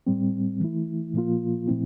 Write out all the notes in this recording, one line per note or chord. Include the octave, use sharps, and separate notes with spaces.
A2 G3 C4
E3 A3 E4
A#2 F3 A#3 F4
A#2 F3 A3 C4 E4